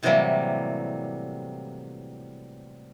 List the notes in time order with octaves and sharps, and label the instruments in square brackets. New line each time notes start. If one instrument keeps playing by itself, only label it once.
[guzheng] A2 C3 E3 F#3 G3 A#3